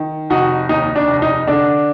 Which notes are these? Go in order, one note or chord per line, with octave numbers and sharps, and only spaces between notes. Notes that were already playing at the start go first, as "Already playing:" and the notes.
Already playing: D#3
F1 D#4 F#4
D#2 D#4
D4
F1
D#4
D3 D4